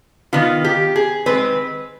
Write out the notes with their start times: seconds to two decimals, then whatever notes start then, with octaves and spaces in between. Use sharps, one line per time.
0.33 D#3 B3 F4
0.64 G4
0.96 G#4
1.26 D#3 G#3 C4 B4